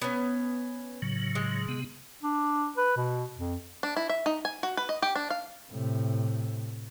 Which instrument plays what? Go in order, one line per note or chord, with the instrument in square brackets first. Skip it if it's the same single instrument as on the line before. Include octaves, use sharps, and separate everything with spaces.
[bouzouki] B3 C#4
[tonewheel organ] A2 C#3 F#3
[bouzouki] G#3
[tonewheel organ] C3 B3
[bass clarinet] D4
B4
B2
F2
[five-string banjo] D4
E4
E5
D#4
G#5
F#4
B4
D#5
G4
D4
F5
[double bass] A2 C3